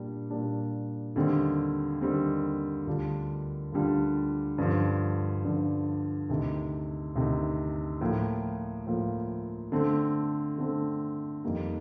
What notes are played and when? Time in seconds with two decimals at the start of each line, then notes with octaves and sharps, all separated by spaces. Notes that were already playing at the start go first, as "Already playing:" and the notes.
Already playing: A#2 G3 D4
0.30 A#2 G3 D4
1.16 D#2 D3 G3 C4
2.02 D#2 D3 G3 C4
2.87 D2 D3 G3 D4 F4
3.72 D2 D3 G3 D4 F4
4.58 G2 D3 F3
5.44 G2 D3 F3
6.29 D2 C3 D#3
7.15 D2 C3 D#3
8.01 A2 F3 A#3 F4
8.87 A2 F3 A#3 F4
9.72 D3 A3 C4
10.58 D3 A3 C4
11.44 F2 D#3 G3 A#3